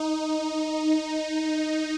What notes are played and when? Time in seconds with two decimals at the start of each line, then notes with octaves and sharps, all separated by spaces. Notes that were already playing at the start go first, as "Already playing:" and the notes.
Already playing: D#4